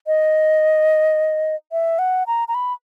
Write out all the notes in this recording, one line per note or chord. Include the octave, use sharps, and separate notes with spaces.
D#5
E5
F#5
A#5
A#5
B5